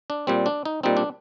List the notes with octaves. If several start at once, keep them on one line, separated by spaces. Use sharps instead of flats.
D4
A#2 G3 C4
D4
D#4
A#2 G3 C4 D#4
D4